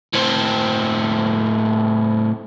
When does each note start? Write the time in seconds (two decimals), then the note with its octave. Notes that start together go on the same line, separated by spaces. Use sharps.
0.14 A2 C4